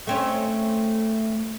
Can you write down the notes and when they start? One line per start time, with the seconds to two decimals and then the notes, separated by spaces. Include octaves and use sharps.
0.07 A3 C4 C#4